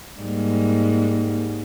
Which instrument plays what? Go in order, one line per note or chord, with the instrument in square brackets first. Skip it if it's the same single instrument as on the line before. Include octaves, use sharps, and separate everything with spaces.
[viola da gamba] G#2 G3 A#3